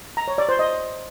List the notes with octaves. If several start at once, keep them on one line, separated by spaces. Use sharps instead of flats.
A#5
C#5
D5
C5
D#5